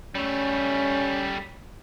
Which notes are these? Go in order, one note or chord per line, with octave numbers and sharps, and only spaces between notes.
G3 A3 C#4